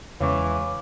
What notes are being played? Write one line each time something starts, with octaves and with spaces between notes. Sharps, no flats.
E2 C#3 E3 G#3 C#5 F5 C#6 D6